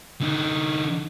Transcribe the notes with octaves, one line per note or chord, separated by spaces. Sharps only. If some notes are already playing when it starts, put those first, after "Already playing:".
D3 D#4